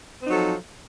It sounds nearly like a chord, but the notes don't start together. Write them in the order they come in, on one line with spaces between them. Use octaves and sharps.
C4 D#4 F#3 A4 F3